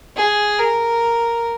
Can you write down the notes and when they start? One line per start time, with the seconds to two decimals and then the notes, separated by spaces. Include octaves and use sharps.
0.16 G#4
0.59 A#4